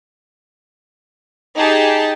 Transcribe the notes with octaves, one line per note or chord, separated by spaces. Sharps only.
D#4 G4 G#4 A5